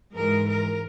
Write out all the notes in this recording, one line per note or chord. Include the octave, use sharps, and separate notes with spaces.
G#2 E3 G#3 A#4
A#4